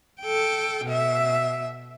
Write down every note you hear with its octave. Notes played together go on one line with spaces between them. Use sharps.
A4 G5
B2 E5